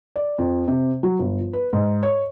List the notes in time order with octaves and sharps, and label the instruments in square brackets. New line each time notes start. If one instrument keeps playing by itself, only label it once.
[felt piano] D5
F2
C3
F#3
G1
F3
B4
G#2
C#5